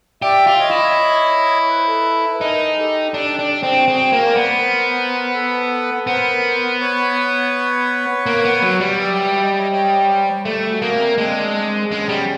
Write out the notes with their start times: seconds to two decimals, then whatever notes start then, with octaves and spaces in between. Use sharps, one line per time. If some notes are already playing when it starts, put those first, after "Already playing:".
0.22 G4 D5 E5
0.47 F4
0.59 C#5 D#5
0.71 E4
1.69 B4
1.77 C5
1.87 A4 B4
2.35 B4
2.41 D#4 G#4 A#4
2.67 A#4
2.78 G4 A4
3.14 D4 G4 A4
3.39 D4
3.51 A4
3.60 G#4
3.63 C4 G4
3.76 F#4 G#4
3.87 C4 F#4 G#4
4.13 A#3
4.24 C5 D5
4.36 B3
4.60 A#4 C5
5.34 A4 B4
6.07 B3 A#4 C5
6.80 B4 C#5
8.26 A#3
8.45 B3
8.63 F#3
8.80 G3
8.99 D5 E5
9.36 E5
9.43 D#5
9.51 D5
9.58 C#5 D#5
9.72 C#5 D#5
10.04 C#5
10.08 C5 D5
10.45 A3 G4 A4
10.69 F#4 G#4
10.82 A#3 C#4
10.93 C4 D4
11.18 G#3 C4 D4
11.91 G#3 B3 C#4
12.09 G3